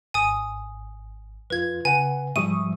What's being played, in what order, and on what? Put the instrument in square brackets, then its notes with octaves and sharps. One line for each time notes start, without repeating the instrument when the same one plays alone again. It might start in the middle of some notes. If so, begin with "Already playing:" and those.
[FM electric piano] G#1 [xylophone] G#5 D#6
[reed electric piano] F2 F4 [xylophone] B4 G#6
[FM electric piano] C#3 [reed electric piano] B4 F#5 [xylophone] G#5
[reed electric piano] G#2 F3 G3 [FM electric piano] E5 C#6 D#6 [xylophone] D#7